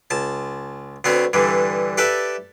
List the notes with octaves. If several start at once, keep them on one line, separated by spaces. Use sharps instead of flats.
C#2 A5
D2 B3 C4 C#5
G2 D3 E3
G4 A4 B4 D5 E5